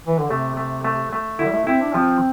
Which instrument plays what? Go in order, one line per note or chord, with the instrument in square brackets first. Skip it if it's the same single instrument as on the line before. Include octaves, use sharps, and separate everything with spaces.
[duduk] E3
D3
[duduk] C3 [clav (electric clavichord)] A3
[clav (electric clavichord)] A3
A3
A3
[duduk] D3 [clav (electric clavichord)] E4
[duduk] G3
A3
[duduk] C4 [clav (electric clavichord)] E4
[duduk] D4
[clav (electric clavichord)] F3 [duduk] C4